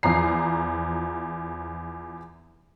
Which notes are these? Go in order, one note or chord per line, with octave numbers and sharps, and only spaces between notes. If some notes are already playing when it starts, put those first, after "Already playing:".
E2 F3 A#5 C7